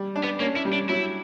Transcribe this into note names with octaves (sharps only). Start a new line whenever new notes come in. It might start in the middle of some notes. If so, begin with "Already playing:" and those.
Already playing: G3
D4
B3
A#3 C#4
E4
G3
D4
F#3 E4